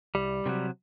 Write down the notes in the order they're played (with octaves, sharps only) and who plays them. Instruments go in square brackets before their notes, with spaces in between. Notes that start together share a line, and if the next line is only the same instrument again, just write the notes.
[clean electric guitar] C2 G3
C3 D#3 F#3